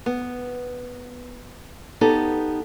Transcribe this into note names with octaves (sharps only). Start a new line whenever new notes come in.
B3
B3 D#4 G4 A4